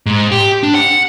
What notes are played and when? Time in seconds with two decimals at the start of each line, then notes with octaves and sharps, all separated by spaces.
0.06 G#2
0.32 G4
0.63 D4
0.75 F#5